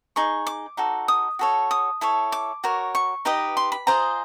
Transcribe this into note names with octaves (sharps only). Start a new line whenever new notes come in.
D#4 G#4 C#6
D6
D#4 F#4 A4
D#6
F#4 A4 C#5
D#6
E4 A4 C#5
D6
F#4 A#4 C#5
C#6
D#4 G4 B4 D#5
C6
B5
F4 G#4 C5 D#5 A#5